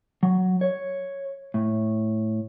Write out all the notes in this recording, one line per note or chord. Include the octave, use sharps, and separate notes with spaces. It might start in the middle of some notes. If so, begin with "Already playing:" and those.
F#3
C#5
A2